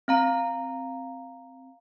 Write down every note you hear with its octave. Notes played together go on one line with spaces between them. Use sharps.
C4 F5 A#5